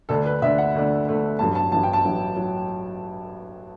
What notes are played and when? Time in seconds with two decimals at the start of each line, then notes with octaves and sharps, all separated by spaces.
0.09 D2 D3 A3 D4 A4
0.26 B4
0.42 D2 D3 A3 D4 E5
0.58 F#5
0.75 D2 D3 A3 D4
1.07 D2 D3 A3 D4
1.39 A1 G2 F#3 A5
1.55 A5
1.72 A1 G2 F#3 A5
1.83 G5
1.93 A5
2.05 A1 G2 F#3
2.36 F#3